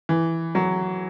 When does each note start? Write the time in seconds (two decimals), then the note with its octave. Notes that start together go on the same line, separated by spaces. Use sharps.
0.09 E3
0.55 F#3